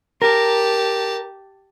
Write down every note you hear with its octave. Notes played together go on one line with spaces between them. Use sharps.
G4 A#4 A5